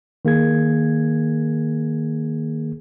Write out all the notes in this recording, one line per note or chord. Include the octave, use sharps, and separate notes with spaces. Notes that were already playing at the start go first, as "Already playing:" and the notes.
D#3 A#3 G#4 G#6